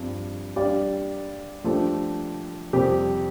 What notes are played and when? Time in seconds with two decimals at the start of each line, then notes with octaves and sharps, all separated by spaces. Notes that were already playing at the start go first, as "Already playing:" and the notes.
Already playing: G2 F3 C4
0.56 G3 D4 G4 D5 F5
1.64 F3 A3 D4 G4
2.73 F2 C3 G3 C4 G4